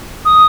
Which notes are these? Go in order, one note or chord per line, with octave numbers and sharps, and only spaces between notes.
D#6